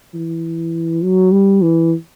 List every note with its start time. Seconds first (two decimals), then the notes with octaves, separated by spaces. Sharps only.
0.14 E3
1.04 F#3
1.32 G3
1.62 E3